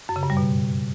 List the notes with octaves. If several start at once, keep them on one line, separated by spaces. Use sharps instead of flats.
F#2
C#3
G2
G3
B2